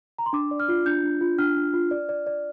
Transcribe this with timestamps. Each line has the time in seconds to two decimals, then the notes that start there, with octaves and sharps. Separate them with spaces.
0.18 A#5
0.26 C6
0.33 D4 D6
0.51 D5
0.60 F6
0.69 F4
0.86 D4 G6
1.04 D4
1.21 F4
1.38 D4 F6
1.57 D4
1.74 F4
1.91 D5
2.09 D5
2.27 D5